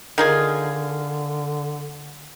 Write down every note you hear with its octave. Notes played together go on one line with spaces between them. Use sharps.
D3 D#3 F4 G#4